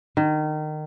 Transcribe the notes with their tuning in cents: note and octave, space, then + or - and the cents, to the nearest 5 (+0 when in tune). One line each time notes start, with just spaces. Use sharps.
D#3 -25